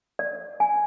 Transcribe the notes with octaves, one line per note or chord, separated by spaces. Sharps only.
D5
G#5